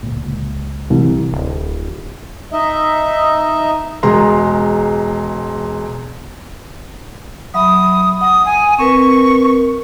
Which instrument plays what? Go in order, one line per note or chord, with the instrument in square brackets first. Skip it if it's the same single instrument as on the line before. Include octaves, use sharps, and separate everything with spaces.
[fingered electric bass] D2 A#2
C#2 A#2
[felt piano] C2 [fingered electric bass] E3
[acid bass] D1
[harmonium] D#4 D#5 E5
[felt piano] E1 G#3 A#5 C6
[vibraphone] F#3 E5 B5 [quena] D#6
[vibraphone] F#5 [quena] D#6
[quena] G#5
[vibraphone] C4 A#4 B4 [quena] C#6